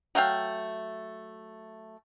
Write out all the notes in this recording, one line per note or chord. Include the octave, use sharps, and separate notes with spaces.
F#3 A3 F5 G5